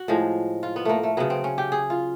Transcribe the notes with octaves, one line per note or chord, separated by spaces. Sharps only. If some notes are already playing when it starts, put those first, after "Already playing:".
Already playing: F#4
A2 F3 G#3
F4
B3
A3 A#3
A3
C#3 F#3 B3
C4
C#4
G4
G#4
F4